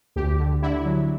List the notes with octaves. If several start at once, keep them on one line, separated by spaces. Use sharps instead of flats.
D2 G4
D3
D3 E4
F#3